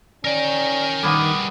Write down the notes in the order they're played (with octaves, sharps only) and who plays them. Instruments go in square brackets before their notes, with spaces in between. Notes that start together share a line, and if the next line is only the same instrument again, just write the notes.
[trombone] C#4 [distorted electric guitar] A#4 G5 [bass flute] D5
[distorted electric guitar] G2 G#4 [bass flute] D#3 [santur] A#3 B3 C#6